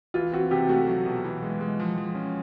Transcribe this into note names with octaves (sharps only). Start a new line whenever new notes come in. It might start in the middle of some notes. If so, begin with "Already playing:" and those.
E3 F4
C4 F#4
C3 G4
A3 F#4
F#3
B2
E3
G#3
G#3
F3
F3
C#4